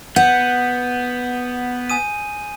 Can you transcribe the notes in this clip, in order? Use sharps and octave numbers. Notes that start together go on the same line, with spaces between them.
B3 F#5 G6
G#5 D#6 D#7